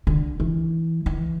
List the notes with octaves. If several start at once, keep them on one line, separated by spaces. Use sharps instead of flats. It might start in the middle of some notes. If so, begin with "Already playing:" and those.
D3
E3
E3